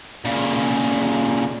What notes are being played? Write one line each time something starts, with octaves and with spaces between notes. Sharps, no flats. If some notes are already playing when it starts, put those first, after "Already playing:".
A#2 C#3